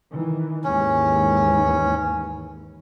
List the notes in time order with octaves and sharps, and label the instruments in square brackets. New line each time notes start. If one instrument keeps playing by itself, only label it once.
[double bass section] D#3 E3
[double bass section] D#2 G#2 E3 [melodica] C#4